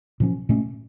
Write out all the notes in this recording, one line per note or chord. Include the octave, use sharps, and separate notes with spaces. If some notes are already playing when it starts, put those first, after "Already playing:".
A#2 F3 C#4
A#2 A3 C#4